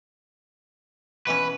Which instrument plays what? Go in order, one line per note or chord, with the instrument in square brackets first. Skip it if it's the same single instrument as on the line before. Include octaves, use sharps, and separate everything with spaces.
[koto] B2 E3 C#4 [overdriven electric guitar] B4